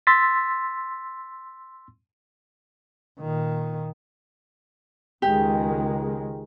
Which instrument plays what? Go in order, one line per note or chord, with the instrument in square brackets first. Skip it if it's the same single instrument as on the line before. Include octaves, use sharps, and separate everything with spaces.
[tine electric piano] C6 E6 A6 B6
[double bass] A#2 D#3
[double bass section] C#2 D#3 G#3 [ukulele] G4